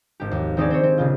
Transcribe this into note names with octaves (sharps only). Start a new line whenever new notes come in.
G#1 G4
D#2
D#3 C4 D#4 G4 G#4 D5
C4 C5 C#5
C4
A#1 C#3 F4